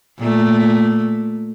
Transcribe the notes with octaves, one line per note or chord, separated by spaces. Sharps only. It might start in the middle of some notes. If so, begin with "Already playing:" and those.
A#2 A3